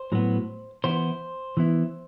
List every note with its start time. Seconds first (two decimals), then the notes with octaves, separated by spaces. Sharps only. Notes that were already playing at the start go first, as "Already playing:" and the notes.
Already playing: C5
0.12 A2 F#3 B3
0.84 E3 B3 E4 C5
1.57 E3 B3 E4